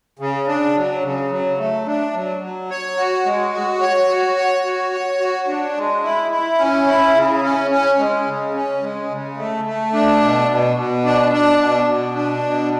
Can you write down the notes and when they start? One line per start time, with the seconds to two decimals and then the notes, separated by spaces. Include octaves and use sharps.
0.19 C#3
0.47 D4
0.75 F#3
1.03 C#3
1.30 F#3
1.58 A3
1.86 D4
2.14 F#3
2.42 F#3
2.70 C#5
2.97 F#4
3.25 G#3
3.53 F#4
3.81 C#5
4.09 F#4
4.37 C#5
4.65 F#4
4.93 C#5
5.20 F#4
5.47 D4
5.76 G#3
6.03 E4
6.32 E4
6.59 C#4
6.87 E4
7.15 C#3
7.43 C#4
7.71 C#4
7.98 G#3
8.26 C#3
8.54 C#4
8.82 G#3
9.10 C#3
9.37 A3
9.65 A3
9.93 D4
10.21 B2
10.48 B2
10.77 B2
11.05 D4
11.32 D4
11.60 B2
11.87 B2
12.15 D4
12.43 B2